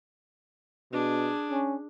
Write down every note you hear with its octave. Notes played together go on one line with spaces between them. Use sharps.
B2 D4 G#4
C#4